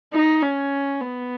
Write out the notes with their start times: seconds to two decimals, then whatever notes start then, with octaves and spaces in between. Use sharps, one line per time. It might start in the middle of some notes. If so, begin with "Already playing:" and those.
0.13 D#4
0.42 C#4
1.01 B3